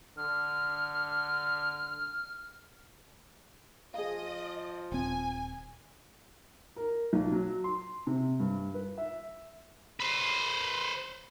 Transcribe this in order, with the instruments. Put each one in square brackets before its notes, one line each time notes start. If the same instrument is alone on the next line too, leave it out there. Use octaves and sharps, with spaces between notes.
[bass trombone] D3 [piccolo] F6
[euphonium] F3 [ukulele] G#4 F5 [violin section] D#5
[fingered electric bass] D#1 C4 [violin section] G#5
[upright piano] A#4
B1
F#3
C6
C3
G2
B4
E5
[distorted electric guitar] B4 C5